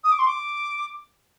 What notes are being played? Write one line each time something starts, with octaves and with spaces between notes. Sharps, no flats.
D#6
D6
C6
D6